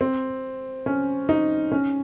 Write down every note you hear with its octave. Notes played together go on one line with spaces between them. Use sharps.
C4
C#4
D#4
C#4